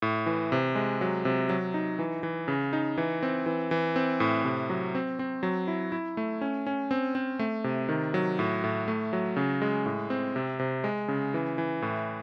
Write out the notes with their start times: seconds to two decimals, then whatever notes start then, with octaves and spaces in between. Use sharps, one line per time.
0.02 A2
0.26 E3
0.52 C3
0.75 G#3
1.01 F#3
1.25 C3
1.49 F#3
1.74 D#4
1.99 E3
2.23 E3
2.48 C#3
2.73 D#4
2.98 E3
3.23 C4
3.46 E3
3.71 E3
3.96 C4
4.20 A2
4.45 C3
4.70 F#3
4.95 C4
5.19 C4
5.43 F#3
5.68 E4
5.92 E4
6.17 A3
6.41 C#4
6.67 C#4
6.91 C4
7.15 C4
7.39 A3
7.64 C3
7.89 D#3
8.14 F#3
8.39 A2
8.64 A2
8.88 A3
9.13 F#3
9.36 C#3
9.62 G#3
9.86 A2
10.10 C4
10.36 C3
10.59 C3
10.84 G#3
11.08 C#3
11.34 E3
11.58 E3
11.82 A2